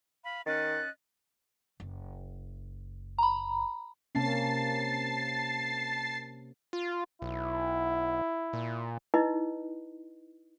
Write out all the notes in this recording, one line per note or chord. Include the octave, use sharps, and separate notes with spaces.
F5 B5
D#3 C#4 D#5 F#6 A6
F#1
A#5 B5
C3 A#3 C#4 A5 A6 C7
F4
B1 E4
A#2
D#4 E4 B4 D#5